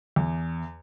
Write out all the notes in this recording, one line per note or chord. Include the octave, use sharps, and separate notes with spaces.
E2